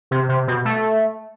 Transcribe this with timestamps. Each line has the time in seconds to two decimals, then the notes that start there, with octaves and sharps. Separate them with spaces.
0.11 C3
0.29 C3
0.48 B2
0.65 A3